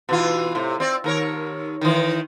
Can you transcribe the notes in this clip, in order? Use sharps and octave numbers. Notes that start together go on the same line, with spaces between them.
B2 E3 F4
A2 C3
C4 D5
D#2 A#4 C#5
D#3 E3